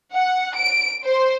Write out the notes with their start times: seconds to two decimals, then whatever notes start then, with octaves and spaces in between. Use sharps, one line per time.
0.14 F#5
0.55 D7
1.04 C5